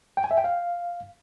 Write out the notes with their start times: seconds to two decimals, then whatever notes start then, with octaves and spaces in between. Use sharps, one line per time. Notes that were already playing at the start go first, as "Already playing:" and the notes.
0.17 G5
0.24 G#5
0.31 E5
0.37 G5
0.44 F5